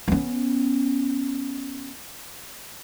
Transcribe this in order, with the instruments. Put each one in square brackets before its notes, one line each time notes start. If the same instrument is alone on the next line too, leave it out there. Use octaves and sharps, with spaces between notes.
[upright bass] B3 C#4